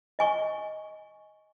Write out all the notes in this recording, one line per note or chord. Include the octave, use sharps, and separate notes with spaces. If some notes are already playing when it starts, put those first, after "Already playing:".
D#5 G#5 C#6